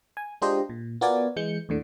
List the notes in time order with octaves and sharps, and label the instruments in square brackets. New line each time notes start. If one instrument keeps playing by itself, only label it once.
[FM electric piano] G#5
G#3 D4 F4 G4 C5 D#5
A#2
B3 F4 F#4 A#4 D5 G#5
E3 G#3 G6 C#7
D#2 A2 D3